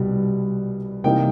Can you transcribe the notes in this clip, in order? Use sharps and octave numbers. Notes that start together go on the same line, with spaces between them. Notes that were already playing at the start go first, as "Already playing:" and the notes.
Already playing: C2 B2 G3
C3 E3 G3 A#3 D#4 G5